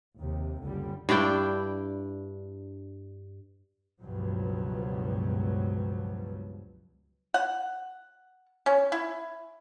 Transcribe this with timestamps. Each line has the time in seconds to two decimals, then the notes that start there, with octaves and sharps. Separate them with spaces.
0.17 D#2 C3
0.63 F#1 C#2 D3 G3
1.09 G2 D4 E4 G5
4.02 C#2 G2 B2 F3 F#3
7.34 F#5
8.66 C#4
8.92 E4